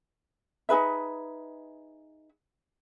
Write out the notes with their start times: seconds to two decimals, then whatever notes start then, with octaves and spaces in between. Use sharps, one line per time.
0.69 D#4 G#4 B4 E5